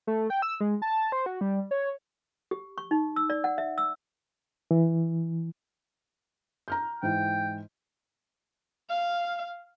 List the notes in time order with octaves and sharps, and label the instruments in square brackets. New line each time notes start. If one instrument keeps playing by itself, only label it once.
[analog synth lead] A3
G5
E6
G#3
A5
C5
F#4
G3
C#5
[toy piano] G4
C#6
D#4
E6
D5
F#5
E5
E6
[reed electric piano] E3
[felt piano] A#5 F6 G6
[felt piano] G#2 E3 [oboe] G5
[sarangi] F5